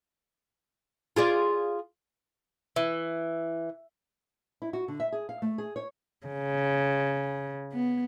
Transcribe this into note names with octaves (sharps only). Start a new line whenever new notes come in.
F4 G#4 D5
E3
E4
F#4
D3
E5
G#4
F5
A3
G#4
C#5
C#3
B3